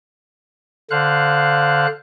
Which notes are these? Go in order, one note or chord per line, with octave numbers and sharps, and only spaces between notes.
D3 C5 F5 F#6